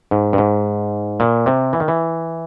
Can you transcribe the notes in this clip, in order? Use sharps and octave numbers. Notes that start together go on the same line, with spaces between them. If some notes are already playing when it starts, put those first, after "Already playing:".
G#2
G2
G#2
A#2
C3
E3
D#3
E3